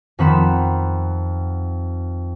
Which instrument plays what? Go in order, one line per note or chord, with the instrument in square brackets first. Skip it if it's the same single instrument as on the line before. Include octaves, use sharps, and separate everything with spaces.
[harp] F2 D#3 C4 F#5 B5 E7